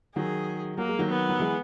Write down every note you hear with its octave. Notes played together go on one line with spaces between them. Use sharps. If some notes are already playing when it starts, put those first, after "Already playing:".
D#3 F#3 G#4
F#3 A#3
G#3
D#3 F#3
B3
F#3
E3 G#3